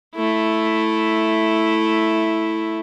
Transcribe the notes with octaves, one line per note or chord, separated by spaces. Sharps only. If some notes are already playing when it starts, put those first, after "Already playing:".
A3 E4